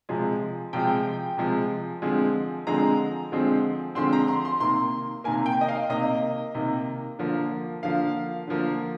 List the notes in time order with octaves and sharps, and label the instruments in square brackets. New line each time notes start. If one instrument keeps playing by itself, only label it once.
[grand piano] C3 F3 G#3
C3 F3 G#3 G5
C3 F3 G#3
D3 F3 G#3 C4
D3 F3 G#3 C4 A#5
D3 F3 G#3 C4
D3 F3 G#3 C4 C6
A#5
C6
C6
C3 D#3 A#3 C6
C3 D#3 A#3 G#5
G5
D#5
F5
C3 D#3 A#3 D#5
C3 D#3 A#3
D3 F3 A#3
D3 F3 A#3 F5
D3 F3 A#3